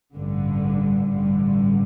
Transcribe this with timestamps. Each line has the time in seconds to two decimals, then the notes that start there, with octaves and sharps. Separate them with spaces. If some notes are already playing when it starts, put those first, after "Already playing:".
0.15 A1 G2 D3
1.08 A1 G2 D3